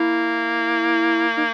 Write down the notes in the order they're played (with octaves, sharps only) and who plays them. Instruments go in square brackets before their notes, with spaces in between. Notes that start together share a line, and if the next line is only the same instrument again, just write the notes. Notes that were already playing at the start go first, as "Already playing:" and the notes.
Already playing: [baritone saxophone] A#3 [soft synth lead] E4
[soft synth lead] D#4